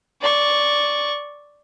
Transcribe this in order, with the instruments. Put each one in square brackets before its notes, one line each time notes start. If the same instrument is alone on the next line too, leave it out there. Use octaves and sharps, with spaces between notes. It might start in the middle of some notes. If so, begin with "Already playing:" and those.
[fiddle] D5 C#6